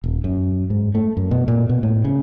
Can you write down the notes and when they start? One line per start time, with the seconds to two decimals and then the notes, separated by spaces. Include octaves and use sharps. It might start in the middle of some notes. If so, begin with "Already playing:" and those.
0.04 D#1
0.24 F#2
0.70 G#2
0.95 A3
1.17 F#2
1.31 B2
1.48 A#2
1.69 B2
1.83 A2
2.05 C#3